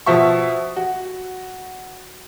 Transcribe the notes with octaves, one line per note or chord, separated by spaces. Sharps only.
B2 F3 E5 C#6
F#4